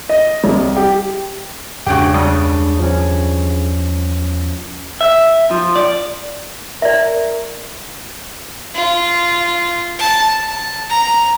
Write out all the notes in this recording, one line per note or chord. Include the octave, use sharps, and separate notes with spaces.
D#5
C2
G4
E2 G2 C#3 G#3 F#4 G4 G5
C#2 G3 D4 D#6
F3 C#4
E5
F3
D5
A#4 D5 E5
F4
A5
A5
A#5